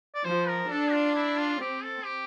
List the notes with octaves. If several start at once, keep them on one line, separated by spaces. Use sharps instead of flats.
D5
F3 C5
A#4
D4 A4
F4
E4
F4
C4 G4
A4
G4